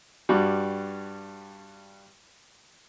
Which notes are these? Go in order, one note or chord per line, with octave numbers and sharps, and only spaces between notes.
G2 G3 F#4